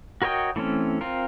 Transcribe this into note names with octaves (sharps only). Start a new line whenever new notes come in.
F#4 A#4 C#5 D#5 G5
E3 A3 C4 C#4
C4 F4 A#4